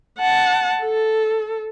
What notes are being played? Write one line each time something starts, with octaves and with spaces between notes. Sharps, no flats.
F#5 A5
A4